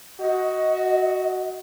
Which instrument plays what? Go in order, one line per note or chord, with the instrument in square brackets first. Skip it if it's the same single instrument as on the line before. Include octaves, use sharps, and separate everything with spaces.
[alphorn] F#4 [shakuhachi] D#5